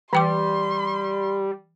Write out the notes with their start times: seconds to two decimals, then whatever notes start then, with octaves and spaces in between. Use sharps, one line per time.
0.13 E3 G3 G5 C6 D6